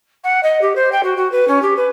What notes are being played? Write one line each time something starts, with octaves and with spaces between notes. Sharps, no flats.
F#5
D#5
G4
C5
G5
F#4
F#4
B4
C#4
G4
B4